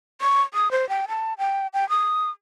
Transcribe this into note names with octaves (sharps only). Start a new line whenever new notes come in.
C#6
D#6
C5
G5
A5
G5
G5
D#6